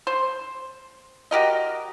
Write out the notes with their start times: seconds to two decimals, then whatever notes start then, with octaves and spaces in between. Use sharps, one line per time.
0.07 C5
1.31 F#4 G4 A#4 D#5